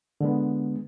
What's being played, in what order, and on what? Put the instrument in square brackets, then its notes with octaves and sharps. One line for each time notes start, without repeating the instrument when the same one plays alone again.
[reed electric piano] D3 G#3 B3